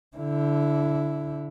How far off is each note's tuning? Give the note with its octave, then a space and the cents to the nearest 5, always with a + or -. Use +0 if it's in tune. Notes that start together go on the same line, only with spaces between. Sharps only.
D3 -20 E4 +0